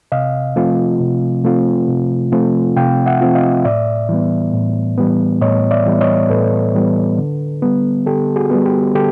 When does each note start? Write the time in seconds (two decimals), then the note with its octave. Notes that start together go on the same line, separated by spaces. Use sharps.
0.12 C3 D#5 F5
0.56 F3 A3 C4 F4
1.00 C3
1.44 F3 A3 C4 F4
1.88 C3
2.32 F3 A3 C4 F4
2.77 C3 F5 G5
3.06 E5 F#5
3.21 F3 A3 C4 F4
3.35 D#5 F5
3.65 A2 D5 E5
4.09 E3 G3 B3
4.53 A2
4.98 E3 G3 B3
5.41 A2 C#5 D#5
5.71 D5 E5
5.86 E3 G3 B3
6.01 C#5 D#5
6.30 A2 A4 B4
6.75 E3 G3 B3
7.18 D3
7.62 G3 B3
8.06 D3 G4 A4
8.36 F#4 G#4
8.51 G3 B3
8.65 G4
8.95 D3 G4 A4